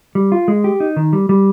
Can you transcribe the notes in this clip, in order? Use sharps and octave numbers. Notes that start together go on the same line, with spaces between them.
G3
F4
G#3
G4
D#4
D#3
G3
G3